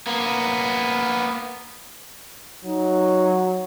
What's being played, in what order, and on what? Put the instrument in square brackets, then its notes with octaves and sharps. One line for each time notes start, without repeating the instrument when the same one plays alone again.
[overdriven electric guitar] A#3 B3
[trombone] F#3 [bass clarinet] D#4